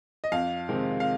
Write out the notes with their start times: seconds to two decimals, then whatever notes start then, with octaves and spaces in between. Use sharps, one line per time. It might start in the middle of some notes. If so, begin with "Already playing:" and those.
0.24 D#5
0.32 F2 F5
0.69 C3 D#3 G#3 C4
1.00 F5